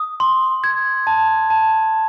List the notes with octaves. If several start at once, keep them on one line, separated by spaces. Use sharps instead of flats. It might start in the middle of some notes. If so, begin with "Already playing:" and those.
Already playing: D#6
C6
G#6
A5
A5